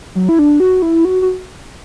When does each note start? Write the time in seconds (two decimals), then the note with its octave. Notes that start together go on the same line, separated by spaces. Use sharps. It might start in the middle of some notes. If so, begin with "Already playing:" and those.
0.15 F#3
0.29 E4
0.39 D4
0.60 F#4
0.82 E4
1.05 F#4
1.22 F#4